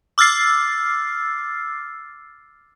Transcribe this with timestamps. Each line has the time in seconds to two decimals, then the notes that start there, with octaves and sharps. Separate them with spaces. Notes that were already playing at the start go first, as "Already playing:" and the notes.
0.18 D6 E6 F6 A6 C7